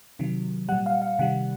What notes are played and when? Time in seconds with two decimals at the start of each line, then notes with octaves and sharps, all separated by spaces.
0.19 C3 D#3 F#3
0.69 A#2 G3 F#5
0.86 F5
1.02 F5
1.19 C3 D#3 G3 F#5